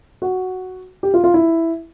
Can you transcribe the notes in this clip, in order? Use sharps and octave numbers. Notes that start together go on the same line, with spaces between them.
F#4
G4
F4
F4
E4